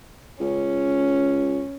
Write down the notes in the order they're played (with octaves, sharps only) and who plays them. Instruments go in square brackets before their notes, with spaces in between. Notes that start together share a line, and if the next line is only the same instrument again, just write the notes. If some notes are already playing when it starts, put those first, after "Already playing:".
[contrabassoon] C#2 [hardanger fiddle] C#4